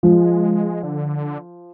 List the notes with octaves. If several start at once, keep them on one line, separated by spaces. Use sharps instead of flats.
F3 G#3
D3